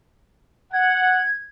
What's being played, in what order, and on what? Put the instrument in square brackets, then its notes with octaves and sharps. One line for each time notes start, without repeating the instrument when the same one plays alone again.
[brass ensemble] F#5 [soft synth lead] G#6